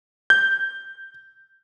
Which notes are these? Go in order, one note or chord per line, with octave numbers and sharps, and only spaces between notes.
G6